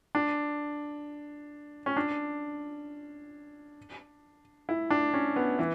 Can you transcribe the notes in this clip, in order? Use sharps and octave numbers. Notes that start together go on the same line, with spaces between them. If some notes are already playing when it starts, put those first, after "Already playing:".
D4
C#4
D4
E4
D4
C#4
B3
E3